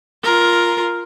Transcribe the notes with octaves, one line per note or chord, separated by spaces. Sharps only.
F4 A#4